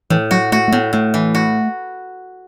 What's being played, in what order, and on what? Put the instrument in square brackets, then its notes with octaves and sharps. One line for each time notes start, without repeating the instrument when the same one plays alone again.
[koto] A2 [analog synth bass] E3
[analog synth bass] F#3 [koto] F#4
[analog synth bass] A3 [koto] F#4
[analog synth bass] A3
[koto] A2 [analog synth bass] B3
[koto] A2 [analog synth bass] A3
[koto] E3
F#4